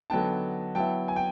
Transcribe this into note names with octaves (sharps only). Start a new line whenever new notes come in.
D3 F#3 B3 D#4 G5 A5
F#3 B3 E4 G5 A5
G#5
G5